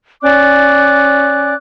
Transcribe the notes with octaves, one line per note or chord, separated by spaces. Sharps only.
C#4 D5 D6 F#6